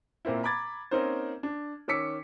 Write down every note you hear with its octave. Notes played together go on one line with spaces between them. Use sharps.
A#2 A#3 C4 E4
A#5 B5 D6 G#6 A6
A#3 C4 C#4 D#4 A#4 C5
D4
D#3 C#4 D6 E6 B6 C#7